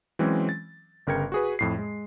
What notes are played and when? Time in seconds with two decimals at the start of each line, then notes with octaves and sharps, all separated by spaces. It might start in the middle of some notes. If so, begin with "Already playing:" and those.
0.19 E3 F#3 G#3 C4 C#4
0.49 A6
1.07 G1 C#3 A#4 G5 G#6 C#7
1.32 F#4 G#4 B4
1.59 F2 A2 C7
1.79 G#3